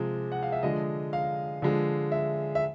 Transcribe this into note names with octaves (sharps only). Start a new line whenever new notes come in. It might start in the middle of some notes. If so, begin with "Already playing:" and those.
Already playing: C3 F3 G#3
F#5
F5
E5
D3 F3 G#3 D#5
F5
D3 F3 G#3
E5
E5